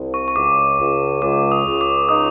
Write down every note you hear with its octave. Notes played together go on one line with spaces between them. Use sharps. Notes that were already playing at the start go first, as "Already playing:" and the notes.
Already playing: C2
C#6
C#6
C#2 D6
C#2
C#2 D6
D#6
C#2
D6
D#4 D#6